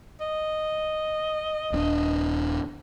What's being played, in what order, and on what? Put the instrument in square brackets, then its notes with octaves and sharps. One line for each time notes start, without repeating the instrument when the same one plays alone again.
[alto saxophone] D#5
[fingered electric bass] D#1 C#4 D4